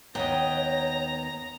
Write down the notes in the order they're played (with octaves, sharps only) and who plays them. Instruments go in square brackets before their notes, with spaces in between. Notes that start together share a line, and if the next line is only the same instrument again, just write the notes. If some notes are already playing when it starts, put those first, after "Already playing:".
[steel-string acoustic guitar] D#2 B3 [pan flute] C#5 [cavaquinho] D#5 G5 [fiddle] A#5